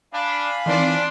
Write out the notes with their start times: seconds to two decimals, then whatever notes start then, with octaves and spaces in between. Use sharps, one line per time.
0.13 D4 F5 G#5 B5
0.66 D#3 E3 C4 D4 D5 C6